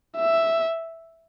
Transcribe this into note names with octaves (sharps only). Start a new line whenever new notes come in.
E5